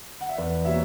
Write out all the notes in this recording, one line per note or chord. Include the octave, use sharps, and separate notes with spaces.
F#5
E5
E2 B4 D5
B2 G3 A#3 C#5 E5